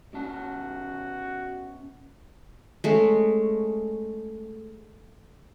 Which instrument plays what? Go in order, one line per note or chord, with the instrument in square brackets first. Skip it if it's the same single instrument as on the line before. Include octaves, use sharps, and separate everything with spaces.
[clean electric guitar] B2 C#4 A5 [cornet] F#4
[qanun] G#3 A3 C#4